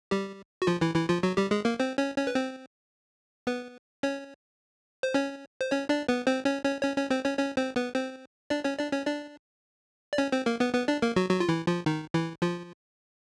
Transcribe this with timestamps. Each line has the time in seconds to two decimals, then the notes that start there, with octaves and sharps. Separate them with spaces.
0.11 G3 G4
0.62 F#4
0.67 F3 F4
0.81 E3 E4
0.95 E3 E4
1.09 F3 F4
1.23 F#3 F#4
1.37 G3 G4
1.51 G#3 G#4
1.65 A#3 A#4
1.80 C4 C5
1.98 C#4 C#5
2.17 C#4 C#5
2.27 B4
2.35 C4 C5
3.47 B3 B4
4.03 C#4 C#5
5.03 C5
5.14 C#4 C#5
5.61 C5
5.71 C#4 C#5
5.89 D4 D5
6.08 B3 B4
6.27 C4 C5
6.45 C#4 C#5
6.64 C#4 C#5
6.83 C#4 C#5
6.96 C#4 C#5
7.10 C4 C5
7.25 C#4 C#5
7.39 C#4 C#5
7.57 C4 C5
7.76 B3 B4
7.95 C4 C5
8.50 D4 D5
8.64 C#4 C#5
8.79 D4 D5
8.92 C#4 C#5
9.06 D4 D5
10.13 D5
10.18 C#4 C#5
10.32 C4 C5
10.46 A#3 A#4
10.60 B3 B4
10.74 B3 B4
10.88 D4 D5
11.02 A#3 A#4
11.16 F#3 F#4
11.30 F#3 F#4
11.40 F4
11.49 E3 E4
11.67 F3 F4
11.86 D#3 D#4
12.14 E3 E4
12.42 F3 F4